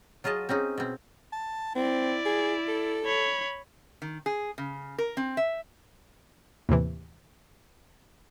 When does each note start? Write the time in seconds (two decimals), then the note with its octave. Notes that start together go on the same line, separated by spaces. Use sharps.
0.24 F#3 F4 G#4 D#5 A5
0.49 C4 C#4 D#4 G#4
0.78 B2 C4
1.32 A5
1.76 C4 E4 D5
2.26 G#4
2.68 A4
3.05 C#5 B5
4.02 D#3
4.26 G#4
4.58 C#3
4.98 A#4
5.17 C4
5.37 E5
6.69 D#2 A2 C3 E3